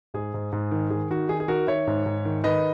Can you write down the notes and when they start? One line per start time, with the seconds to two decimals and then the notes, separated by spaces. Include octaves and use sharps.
0.14 G#2 G#4
0.34 G#2
0.52 G#2
0.71 D#3
0.90 D#3 G#4
1.10 D#3 F#4
1.29 D#3 G#4
1.40 G#4
1.48 D#3 F#4 A#4
1.67 D#3 C#5 E5
1.87 G#2
2.06 G#2
2.25 D#3
2.44 D#3 B4 D#5